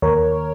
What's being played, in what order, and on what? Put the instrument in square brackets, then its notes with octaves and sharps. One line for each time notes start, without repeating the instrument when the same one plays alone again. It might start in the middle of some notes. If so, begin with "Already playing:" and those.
[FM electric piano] D#2 A#4 C#5